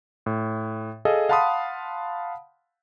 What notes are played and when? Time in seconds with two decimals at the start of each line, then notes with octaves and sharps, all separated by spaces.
0.26 A2
1.05 G#4 A4 D#5 F5
1.29 F5 F#5 A5 B5 C6 D#6